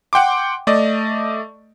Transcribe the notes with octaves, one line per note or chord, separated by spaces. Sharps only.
F#5 G5 C6 D6
A3 D5 D#5